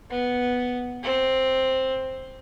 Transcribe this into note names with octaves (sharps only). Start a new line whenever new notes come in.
B3
C4